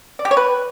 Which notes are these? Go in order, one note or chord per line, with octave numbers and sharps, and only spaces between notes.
D5
G4
C#5
B4